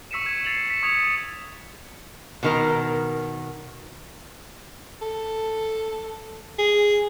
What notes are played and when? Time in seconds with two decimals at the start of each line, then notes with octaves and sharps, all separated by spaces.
0.11 C#6 E6 B6 C#7 D#7 E7
0.25 E6 G#6 E7
0.45 G#6 A6 C7 C#7 F7 F#7
0.70 B6 C#7 E7
0.83 C#6 D#6 G#6 C#7 F7
0.97 D#6
2.43 B2 D#3 A#4
5.02 A4
6.59 G#4